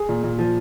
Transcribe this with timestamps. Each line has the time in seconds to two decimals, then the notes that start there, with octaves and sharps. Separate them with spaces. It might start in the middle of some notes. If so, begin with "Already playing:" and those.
Already playing: G#4
0.09 A#2
0.24 A#2
0.39 F3